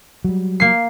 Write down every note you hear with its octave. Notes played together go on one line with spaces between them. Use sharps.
F#3 G3
A#3 C7